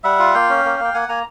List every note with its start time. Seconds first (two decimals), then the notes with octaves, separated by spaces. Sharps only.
0.04 G3 E5 F#5
0.19 F4
0.34 A#3 F5 G5
0.49 C#4
0.65 A#3
0.79 A#3 G5
0.94 A#3 F#5 G#5
1.09 A#3 G#5 A#5